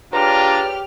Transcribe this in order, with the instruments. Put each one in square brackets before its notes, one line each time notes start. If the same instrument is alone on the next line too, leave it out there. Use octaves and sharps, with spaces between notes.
[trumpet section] D4 F4 [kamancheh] G4 F6 [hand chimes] G#4 B4 C#5 [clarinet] A#5